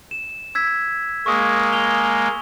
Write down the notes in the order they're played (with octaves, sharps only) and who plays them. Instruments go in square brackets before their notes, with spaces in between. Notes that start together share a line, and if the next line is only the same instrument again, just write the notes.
[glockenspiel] E7
E6 G#6 B6
[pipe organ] G#3 A#3 [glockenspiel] C#6 D#6
[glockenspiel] G#5 F7 G7